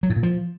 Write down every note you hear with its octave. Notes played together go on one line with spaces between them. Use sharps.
F#3
A2
A#2
F3